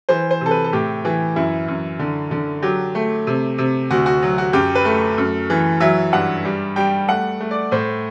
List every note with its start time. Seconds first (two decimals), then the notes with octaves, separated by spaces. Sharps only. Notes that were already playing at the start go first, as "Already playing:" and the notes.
0.09 E3 C5
0.31 C5
0.41 C3 A4
0.51 B4
0.64 A4
0.73 A2 G4
1.05 E3
1.36 F#2 E4
1.68 F#2
1.99 D3
2.31 D3
2.62 F#3 G4
2.95 A3
3.27 C3
3.58 C3
3.90 D2 F#4
4.06 F#4
4.22 F#3
4.38 F#4
4.53 F#2 G4
4.75 B4
4.85 A3
5.18 F#2
5.50 E3
5.80 F#3 E5
6.13 G2 F#5
6.45 G3
6.76 G3 G5
7.08 A3 F#5
7.40 A3
7.51 D5
7.71 A2 C5